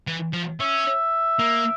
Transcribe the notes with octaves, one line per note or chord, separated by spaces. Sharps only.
E3
F3
C#4 E5
A#3